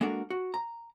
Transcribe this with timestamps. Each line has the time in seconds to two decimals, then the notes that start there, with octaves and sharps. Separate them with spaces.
0.01 G#3 A#3 D4 F#4 A4 A#4
0.30 F#4
0.54 A#5